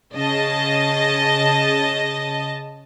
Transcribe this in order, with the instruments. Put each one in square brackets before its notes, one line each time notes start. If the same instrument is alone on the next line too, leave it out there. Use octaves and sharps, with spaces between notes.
[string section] C#3 D#5 A5